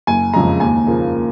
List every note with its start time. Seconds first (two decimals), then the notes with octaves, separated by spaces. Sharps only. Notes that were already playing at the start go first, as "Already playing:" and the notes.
0.07 F#1 G#5
0.33 F2 C#3 G#3 A#5
0.60 D#2 G#5
0.87 C#3 F3 A#3